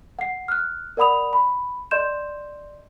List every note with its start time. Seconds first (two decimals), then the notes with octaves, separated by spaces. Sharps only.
0.19 F#5 C7
0.48 F6 F#6
0.97 A#4 D5 F#5 B5 D#6 F7
1.33 B5
1.91 D5 D#5 C6 G6 E7